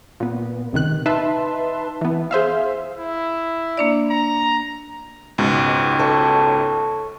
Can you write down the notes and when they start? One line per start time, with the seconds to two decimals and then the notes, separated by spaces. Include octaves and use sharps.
0.20 A#2 B3
0.73 C#2 C3 D#3 F#6
1.06 D#4 B4 E5 A5 C6
2.01 E3 B3
2.31 G#4 C5 E5 F5
2.98 E4
3.77 A#3 D4 D5
4.10 A#5
5.38 C#2 G#2 B2
5.99 A4 C#5